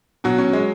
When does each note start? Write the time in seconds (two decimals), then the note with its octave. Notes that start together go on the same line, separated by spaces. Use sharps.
0.24 B2 F#3 F#4
0.38 C#4
0.53 G#3